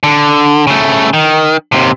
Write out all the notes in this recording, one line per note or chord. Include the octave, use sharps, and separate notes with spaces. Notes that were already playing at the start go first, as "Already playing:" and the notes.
D3
C#3 A3
D#3
D#2 C3